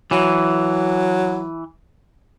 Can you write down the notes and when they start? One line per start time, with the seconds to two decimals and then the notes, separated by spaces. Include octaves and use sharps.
0.11 E3 F#3